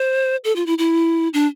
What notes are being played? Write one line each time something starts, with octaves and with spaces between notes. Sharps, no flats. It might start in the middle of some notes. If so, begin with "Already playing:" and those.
Already playing: C5
A4
F4
E4
E4
D4